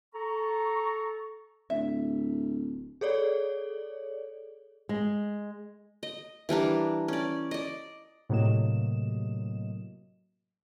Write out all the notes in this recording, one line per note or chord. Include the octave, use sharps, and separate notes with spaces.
A4 A#5 C#6
D1 E5
G#4 A4 C#5 D5
G#3
D#5
E3 G3 D4 A#4
C#4 D5
D5 D#5
A2 C3 F#3 A#3 D#5 E7